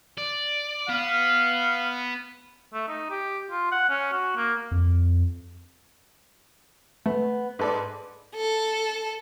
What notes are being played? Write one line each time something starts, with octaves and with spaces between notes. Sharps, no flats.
D5
B3 F5
A3
D#4
G4
F4
F#5
C#4
F#4
A#3
F2
A3 B3
G#2 A4 B4 D5
A4